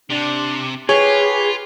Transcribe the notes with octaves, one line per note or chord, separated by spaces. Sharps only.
C3 D4
F4 G4 G#4 B4 C#5